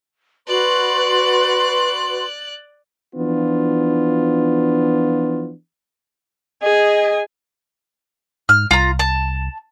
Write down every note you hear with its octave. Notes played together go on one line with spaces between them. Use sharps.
F#4 B4 D5 C6 F#6
E3 F3 B3 D4 F4
G#4 D#5 G#5
G#2 F6
C2 F4 A#5
A5